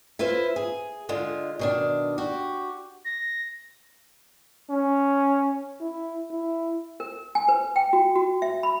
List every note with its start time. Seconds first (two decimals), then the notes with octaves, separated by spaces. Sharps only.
0.19 E4 F4 B4 C5
0.56 G#4
1.09 D3 G#3 F4
1.59 B2 D#3 D4
2.18 F#4 G4
3.05 A#6
4.70 C#4
5.81 E4
6.31 E4
7.00 A#4
7.35 G#5
7.49 B4
7.76 G5
7.93 F#4
8.16 F#4
8.42 E5
8.63 B5